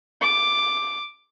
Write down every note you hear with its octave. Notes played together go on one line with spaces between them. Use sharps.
D6